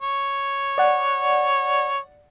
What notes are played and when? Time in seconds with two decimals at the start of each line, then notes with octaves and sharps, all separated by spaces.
0.02 C#5
0.78 D5 F#5